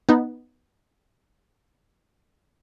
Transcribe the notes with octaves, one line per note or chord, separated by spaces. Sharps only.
B3 D#4